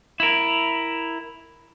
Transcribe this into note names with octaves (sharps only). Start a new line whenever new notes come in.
E4 A#4